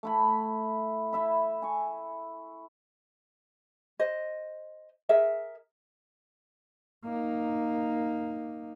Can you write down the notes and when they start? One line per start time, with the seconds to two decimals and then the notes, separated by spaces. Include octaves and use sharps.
0.03 A3 E4 B5
1.13 E4 E5 B5
1.62 G#5 C#6
3.99 C5 D#5
5.09 G#4 A#4 E5
7.04 A#3 D#4